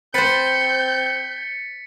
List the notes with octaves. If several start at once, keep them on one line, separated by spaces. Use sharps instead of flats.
C4 B4 C5 G6 A6 B6 C#7